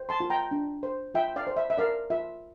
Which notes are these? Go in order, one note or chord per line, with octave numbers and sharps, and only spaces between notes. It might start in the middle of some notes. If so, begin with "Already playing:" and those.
Already playing: C5
A5 C6
F4
G5 A#5
D4
C5
F4 E5 G5
D5 F5
C5
E5
E5
A#4 D5 F5
F4 E5